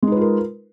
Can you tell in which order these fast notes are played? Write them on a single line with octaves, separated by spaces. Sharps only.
G#3 D#4 B4 F4 A#4